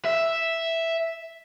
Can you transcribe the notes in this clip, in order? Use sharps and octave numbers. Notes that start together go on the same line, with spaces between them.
E5